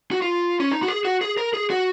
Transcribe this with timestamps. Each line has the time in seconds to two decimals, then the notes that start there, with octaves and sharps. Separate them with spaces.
0.11 F#4
0.22 F4
0.60 C#4
0.72 D#4
0.83 F#4
0.88 G#4
1.05 F#4
1.21 G#4
1.37 A#4
1.54 G#4
1.70 F#4